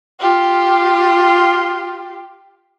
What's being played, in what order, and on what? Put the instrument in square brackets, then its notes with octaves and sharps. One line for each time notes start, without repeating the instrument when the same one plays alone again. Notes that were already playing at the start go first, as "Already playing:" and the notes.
[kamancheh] F4 G4